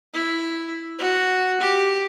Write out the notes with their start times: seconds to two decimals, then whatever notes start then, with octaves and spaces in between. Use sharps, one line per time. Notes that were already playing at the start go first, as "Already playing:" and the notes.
0.14 E4
0.98 F#4
1.60 G4